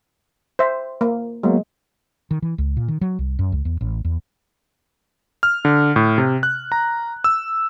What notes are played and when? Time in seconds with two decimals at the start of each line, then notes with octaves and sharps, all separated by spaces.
0.59 C5 E5
1.01 A#3
1.43 F#3 G#3 A#3 B3
2.31 D#3
2.42 E3
2.58 C#2
2.77 A#2
2.88 D#3
3.01 F#3
3.19 C2
3.39 F#2
3.52 C#2
3.65 E2
3.81 A1
4.05 E2
5.43 F6
5.65 D3
5.96 A2
6.18 C3
6.43 F#6
6.72 A#5
7.24 E6